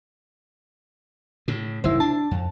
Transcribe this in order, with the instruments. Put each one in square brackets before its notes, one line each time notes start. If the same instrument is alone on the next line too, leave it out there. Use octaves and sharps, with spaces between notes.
[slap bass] A2 C#3
[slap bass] F#1 C2 D#3 [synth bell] E4 C5
[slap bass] D4 [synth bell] A5
[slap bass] F2